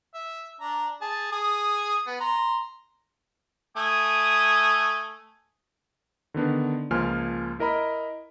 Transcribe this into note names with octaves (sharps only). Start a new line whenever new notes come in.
E5
D4 A#5
G#4 A5
G#4 D#6
B3
A#5 C6
A3 G#5 D#6
D3 D#3 B3 D4
C#2 F3 A#3 G#5 C6 F6
E4 A#4 D#5 A#5 B5